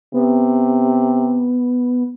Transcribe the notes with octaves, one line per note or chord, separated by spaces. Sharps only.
C3 B3